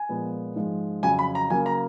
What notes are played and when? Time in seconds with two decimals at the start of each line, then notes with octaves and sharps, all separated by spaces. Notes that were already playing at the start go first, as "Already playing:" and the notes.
Already playing: G#5
0.09 A#2 F3 G#3 B3
0.56 G#2 F3 G#3
1.03 F2 C#3 F#3 G#5
1.19 B5
1.35 A#5
1.50 C#3 F#3 A#3 G#5
1.66 A#5